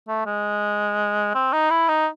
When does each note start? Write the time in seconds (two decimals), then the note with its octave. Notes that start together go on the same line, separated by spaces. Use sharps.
0.08 A3
0.26 G#3
1.35 C4
1.53 D#4
1.70 E4
1.88 D#4